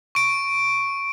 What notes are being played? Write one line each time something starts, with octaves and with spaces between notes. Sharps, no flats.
C#6 D7